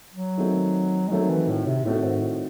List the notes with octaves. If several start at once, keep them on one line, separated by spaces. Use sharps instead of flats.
F#3
D#3 A3 C4 F#4 A4
G#3
D#3 F#3 A3 C4 F#4 A4
E3
A2
C3
A2 D#3 A3 C4 F#4 A4
G#2
A2